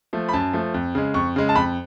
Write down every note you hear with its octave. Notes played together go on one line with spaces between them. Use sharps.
F3 A3
B5
F#2 A5
F3 A3
F2
C#3 G#3
F2 C#6
C#3 G#3
A5
F2 B5